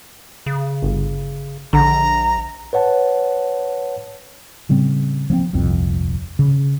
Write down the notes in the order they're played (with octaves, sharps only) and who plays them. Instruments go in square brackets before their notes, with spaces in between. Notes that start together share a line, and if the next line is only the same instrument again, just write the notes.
[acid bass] C#3
[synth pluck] G1
[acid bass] A#1 [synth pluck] D3 [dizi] A#5
[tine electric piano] B4 C#5 F#5 A5
[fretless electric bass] A2 C#3 G3 C4
F3 A#3 C4
D#1 C2 F2 C4
C#3